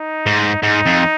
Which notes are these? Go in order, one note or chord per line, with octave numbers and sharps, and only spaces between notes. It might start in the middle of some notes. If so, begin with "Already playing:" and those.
Already playing: D#4
G#2
G#2 D#4
F2